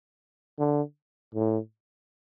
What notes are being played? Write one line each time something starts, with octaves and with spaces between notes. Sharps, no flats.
D3
A2